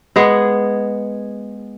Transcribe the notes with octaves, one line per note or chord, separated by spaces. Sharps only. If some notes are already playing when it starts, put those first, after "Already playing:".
G#3 B3 G#4